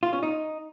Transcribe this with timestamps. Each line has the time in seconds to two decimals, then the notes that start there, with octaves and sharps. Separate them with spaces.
0.03 F4
0.13 C#4
0.23 D#4